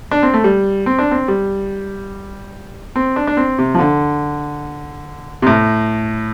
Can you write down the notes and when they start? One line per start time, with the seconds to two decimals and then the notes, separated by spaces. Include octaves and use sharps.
0.11 D4
0.23 C4
0.34 A3
0.44 G3
0.86 C4
0.99 D4
1.11 C4
1.28 G3
2.96 C4
3.16 D4
3.27 D4
3.37 C4
3.59 C3
3.75 F3
3.79 D3
5.42 C3
5.46 A2